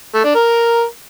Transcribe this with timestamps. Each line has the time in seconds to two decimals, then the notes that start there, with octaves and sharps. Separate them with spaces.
0.14 A3
0.25 D4
0.35 A#4